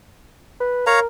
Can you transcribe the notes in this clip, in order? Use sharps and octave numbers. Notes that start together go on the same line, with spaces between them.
B4
A#4 C#5 F5 A#5